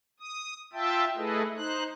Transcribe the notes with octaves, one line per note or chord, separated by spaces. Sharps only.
D#6
F4 E5 G5 A5
A3 E4 G#4 A4 B4 D#5
D#4 C5 F#6